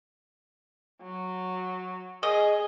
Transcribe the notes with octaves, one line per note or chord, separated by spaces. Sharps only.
F#3
G#4 D#5